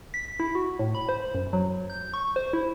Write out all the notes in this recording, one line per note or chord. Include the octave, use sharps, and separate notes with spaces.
B6
E4
F#4
A2
B5
C5
F#2
F#3
G6
C#6
C5
E4